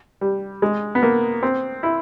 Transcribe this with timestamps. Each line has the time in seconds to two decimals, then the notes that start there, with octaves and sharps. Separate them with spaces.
0.21 G3
0.62 G#3
0.95 B3
1.03 A#3
1.43 C4
1.83 E4